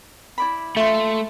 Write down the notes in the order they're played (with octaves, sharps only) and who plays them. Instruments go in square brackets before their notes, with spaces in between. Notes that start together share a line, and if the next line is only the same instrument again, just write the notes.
[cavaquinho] E4 D5 B5
[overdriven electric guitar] A3 [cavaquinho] F4 C6 [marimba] E5